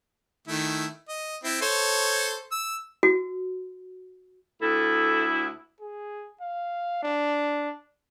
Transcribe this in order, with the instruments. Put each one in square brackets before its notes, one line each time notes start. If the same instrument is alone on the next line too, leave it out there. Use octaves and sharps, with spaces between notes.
[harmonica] D#3 A3 E4
D#5
C4 E4
A4 C5 C#5
E6
[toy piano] F#4
[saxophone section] D2 E4 [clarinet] A4
[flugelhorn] G#4
F5
D4